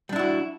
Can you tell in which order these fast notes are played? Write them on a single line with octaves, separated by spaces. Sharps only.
G3 D4 E4 F#4